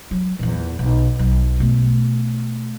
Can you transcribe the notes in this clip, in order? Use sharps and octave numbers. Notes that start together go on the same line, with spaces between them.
F#3
E2 A#2
B1
B1
B2 A3